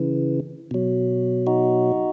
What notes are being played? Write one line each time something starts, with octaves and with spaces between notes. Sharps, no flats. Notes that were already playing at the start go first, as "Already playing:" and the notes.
Already playing: C#3 E3
B2 F#3
D#4 F#4